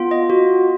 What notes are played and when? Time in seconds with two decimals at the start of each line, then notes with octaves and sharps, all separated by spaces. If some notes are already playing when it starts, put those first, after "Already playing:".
Already playing: B3 F4
0.11 D#5
0.30 F#4